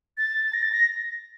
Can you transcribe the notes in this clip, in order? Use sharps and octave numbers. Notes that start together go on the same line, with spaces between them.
A6
A#6
A6
A#6